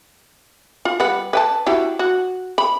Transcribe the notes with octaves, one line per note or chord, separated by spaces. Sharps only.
F4
G3 B4 F#5
B4 G5 A5
E4 F#4 G4
F#4
B5